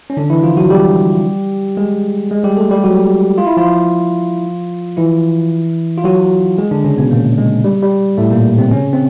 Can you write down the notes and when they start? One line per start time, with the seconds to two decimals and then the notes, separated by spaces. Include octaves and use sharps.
0.10 C#4
0.17 D3 D4
0.30 E3 E4
0.43 F3 F4
0.57 F#3 F#4
0.70 G3 G4
1.77 G#3 G#4
2.31 G#3 G#4
2.44 G3 G4
2.57 A3 A4
2.71 G3 G4
2.84 F#3 F#4
3.38 F4
3.47 E4
3.57 F3 F4
4.97 E3 E4
5.98 F4
6.04 F#3 F#4
6.58 G#3 G#4
6.71 D3 D4
6.84 C#3 C#4
6.98 B2 B3
7.11 A#2 A#3
7.38 G#3
7.64 G3
7.83 G3
8.18 A2 A3
8.31 A#2 A#3
8.58 C3 C4
8.71 C#3 C#4
8.93 C4